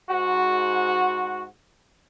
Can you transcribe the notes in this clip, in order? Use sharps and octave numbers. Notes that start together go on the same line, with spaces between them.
G#2 F#4